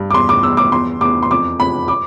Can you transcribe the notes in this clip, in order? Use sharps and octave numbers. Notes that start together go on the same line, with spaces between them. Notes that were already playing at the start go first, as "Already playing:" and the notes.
Already playing: G2
D6
E2 C6
D6
E2 E6
D6
E2 C6
E2 D6
C6
F2 D6
F2 B5
D6